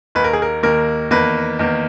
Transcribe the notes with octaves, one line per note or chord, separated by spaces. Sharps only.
D#2 D#3 A#3 B4
A#4
G#4
A#4
D#2 D#3 A#3 A#4
E2 D#3 A#3 B4
E2 D#3 A#3